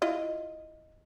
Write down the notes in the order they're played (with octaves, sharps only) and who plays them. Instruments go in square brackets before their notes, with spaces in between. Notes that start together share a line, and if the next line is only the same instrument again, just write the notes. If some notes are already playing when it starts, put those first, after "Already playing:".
[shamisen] E4 F4 D#5